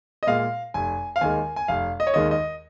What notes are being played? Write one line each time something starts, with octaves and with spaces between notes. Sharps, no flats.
D#5
A#2 G#3 F5
F1 G#5
F5
D#2 D#3 G#3 G#5
G#5
F1 F5
D#5
C#5
D#2 D#3 G#3 D#5
D#5